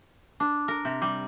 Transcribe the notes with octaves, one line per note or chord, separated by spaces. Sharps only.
D4
A#4
C3
G3